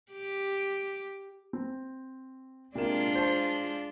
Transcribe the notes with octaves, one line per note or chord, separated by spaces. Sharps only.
G4
C4
C3 G#3 A#3 D4 F4 E7
C5 A5 C6